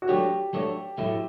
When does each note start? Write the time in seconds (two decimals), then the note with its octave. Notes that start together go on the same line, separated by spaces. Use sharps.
0.02 F#4
0.08 F#3 A3 D4 G4 A4 C#5
0.53 F#3 A3 D4 A4 C#5
0.98 A2 F#3 A3 E4